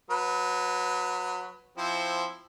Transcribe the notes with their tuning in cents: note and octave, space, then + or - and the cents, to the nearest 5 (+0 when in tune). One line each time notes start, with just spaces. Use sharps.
F#3 -20 B4 +0
F3 -5 C4 +0 E4 +0